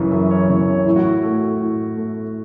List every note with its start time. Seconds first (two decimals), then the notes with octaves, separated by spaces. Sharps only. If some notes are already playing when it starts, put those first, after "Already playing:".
Already playing: F#2 C#3 E3
0.12 F#2 E5
0.31 C#5
0.49 C#3 E3 C#5
0.68 C#5
0.85 A2 E4
0.96 F#4
1.05 E4
1.23 A3
1.60 A2
1.97 A3